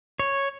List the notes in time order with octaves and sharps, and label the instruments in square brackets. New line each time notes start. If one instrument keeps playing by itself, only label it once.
[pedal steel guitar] C#5